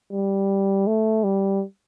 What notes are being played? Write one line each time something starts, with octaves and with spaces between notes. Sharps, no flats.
G3
A3
G3